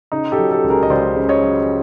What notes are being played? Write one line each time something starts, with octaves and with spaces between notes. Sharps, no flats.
C#3 D#4
G4 A4
F#3
G4 A4
C#2
G#4 A#4
D#5
C#2 C5 D5
C#3
C#5 D#5
F#3